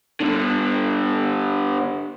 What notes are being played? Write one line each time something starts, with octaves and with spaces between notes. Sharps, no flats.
G2 D3